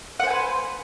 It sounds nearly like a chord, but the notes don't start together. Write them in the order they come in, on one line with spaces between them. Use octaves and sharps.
F#5 C5 G#5 B4